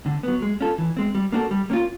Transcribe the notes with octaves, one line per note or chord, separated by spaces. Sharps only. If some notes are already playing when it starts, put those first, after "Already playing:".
D3
F#3 B3
G#3
C#4 F4 A4
E3
G#3 C4
G3
A#3 D4 F#4 A4
G3
A#3 C#4 F4